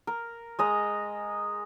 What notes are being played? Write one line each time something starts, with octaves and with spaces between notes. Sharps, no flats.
A#4
G#3 D#5 A#5